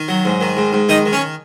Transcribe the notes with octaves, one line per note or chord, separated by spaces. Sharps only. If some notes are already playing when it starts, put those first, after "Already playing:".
Already playing: D#3
F#3
G#2
D#3
G#2
G#2
D#3 D#4 D#5
D#3
C#4 C#5